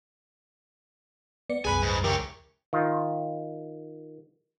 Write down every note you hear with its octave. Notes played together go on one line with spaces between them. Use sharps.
B3 D5 C#7
C2 F#2 G#4 B4 G#5 B5
G#2
C#2 E3 G4 A#4 C#5
D#3 F4